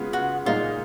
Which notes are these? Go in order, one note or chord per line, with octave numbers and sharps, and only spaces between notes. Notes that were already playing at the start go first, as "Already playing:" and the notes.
Already playing: C#3 G#3 B3 F4
F#4
A#2 G#3 D#4 F4